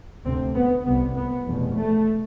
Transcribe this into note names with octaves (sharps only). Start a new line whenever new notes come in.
D2 C3 C4
B3
C2 C3 B3
B3
F1 E2 B2
A3